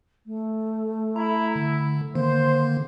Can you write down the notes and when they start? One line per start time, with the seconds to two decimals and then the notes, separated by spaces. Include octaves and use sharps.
0.26 A3
1.16 E4 A#5 B5
1.56 D3
2.15 D3 D#3 A#3 C5